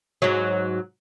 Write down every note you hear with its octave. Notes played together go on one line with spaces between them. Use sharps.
G#2 F#3